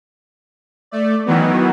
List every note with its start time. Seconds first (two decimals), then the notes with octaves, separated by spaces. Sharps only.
0.91 A3 D5
1.26 D#3 E3 F#3 B3